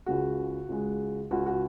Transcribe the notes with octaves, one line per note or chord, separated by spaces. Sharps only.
C#2 C#3 G#3 F#4
C#2 C#3 G#3
C#2 C#3 G#3 F#4
F#4